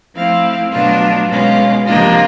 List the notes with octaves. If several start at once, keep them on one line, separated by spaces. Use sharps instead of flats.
F3 A3 C4 E4 F5
B2 F#3 A3 D4 F4
B2 G#3 C#4 F4
C3 F3 A#3 D4 F4 D#5